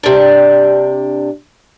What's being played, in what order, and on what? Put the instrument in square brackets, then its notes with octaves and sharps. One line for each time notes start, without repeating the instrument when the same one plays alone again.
[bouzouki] C3 D4